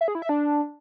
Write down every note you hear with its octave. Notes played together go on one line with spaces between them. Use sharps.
E5
G#4
E4
E5
D4